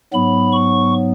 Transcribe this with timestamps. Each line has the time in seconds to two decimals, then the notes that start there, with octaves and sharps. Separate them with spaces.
0.13 G#2 F#3 B3 B5
0.52 C#6